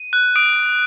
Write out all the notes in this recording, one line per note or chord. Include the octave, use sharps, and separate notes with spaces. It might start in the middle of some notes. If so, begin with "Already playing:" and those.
Already playing: D#7
F#6
D#6 D7